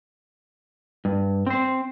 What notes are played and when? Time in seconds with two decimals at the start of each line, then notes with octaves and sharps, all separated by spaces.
1.05 G2
1.47 C4 C5